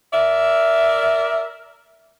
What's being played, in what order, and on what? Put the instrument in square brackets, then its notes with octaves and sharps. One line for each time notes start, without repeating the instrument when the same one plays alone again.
[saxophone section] A#4 D5 E5